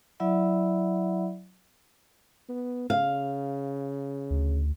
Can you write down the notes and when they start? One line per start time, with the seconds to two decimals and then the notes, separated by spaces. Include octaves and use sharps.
0.20 F#3 E4 D5 E5 F#5 B5
2.49 B3
2.90 C#3 F5
4.30 D2